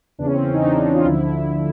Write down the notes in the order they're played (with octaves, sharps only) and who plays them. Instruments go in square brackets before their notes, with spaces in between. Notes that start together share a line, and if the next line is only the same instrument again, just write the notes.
[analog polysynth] E2 C#3 E3 D4
C#4
C4
C#4
D#4
D4
F4
D2 D3 F3 E4